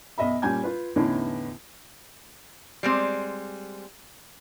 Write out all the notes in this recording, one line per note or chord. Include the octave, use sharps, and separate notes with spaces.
B1 D#5 E5 B5
A#2 G3 C#4 G#5 G6 G#6
F4 B4
E2 A2 D3 E3 C#4 D#4
G3 G#3 C4